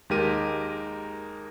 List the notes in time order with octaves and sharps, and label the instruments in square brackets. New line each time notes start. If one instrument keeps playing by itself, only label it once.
[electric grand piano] D#2 G#3 D#4 G4 A#4 D#7